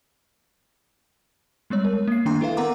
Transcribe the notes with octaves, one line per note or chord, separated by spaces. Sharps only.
G3 G#3 B3 C#5
A#4
A#3 C7
D#3 A#3 D4 G5 A#5 C6
E4 A4 B4 E5 F5
B3 A#4 F#5 A#5 D6